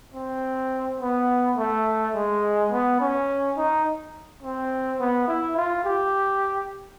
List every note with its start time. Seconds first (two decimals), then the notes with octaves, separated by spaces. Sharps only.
0.14 C4
1.00 B3
1.57 A3
2.15 G#3
2.71 B3
3.00 C#4
3.57 D#4
4.43 C4
5.00 B3
5.28 E4
5.57 F4
5.85 G4